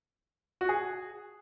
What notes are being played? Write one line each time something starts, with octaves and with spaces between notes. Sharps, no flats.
F#4
G#4